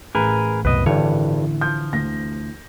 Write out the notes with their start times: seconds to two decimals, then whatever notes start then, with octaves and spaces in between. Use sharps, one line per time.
0.15 A1 G#4 A#4 B4
0.65 C2 F#2 B2 B4 D#5
0.86 G#1 G2 D3 E3 C#5
1.61 F3 G6
1.93 D2 A#6